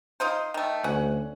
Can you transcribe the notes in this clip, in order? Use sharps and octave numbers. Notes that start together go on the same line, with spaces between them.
D#4 F4 C5
D#3 A3
D2 C#4 F#5